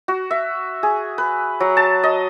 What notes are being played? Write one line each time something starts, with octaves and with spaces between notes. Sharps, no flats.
F#4
E5
G#4
B4
F#3
A5
D#5